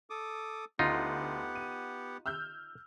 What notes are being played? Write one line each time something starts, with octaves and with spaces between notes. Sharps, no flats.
A4 D6 D#6
D2 B3 D#4 F4 G4 F#5
D#7
E6 F6 G6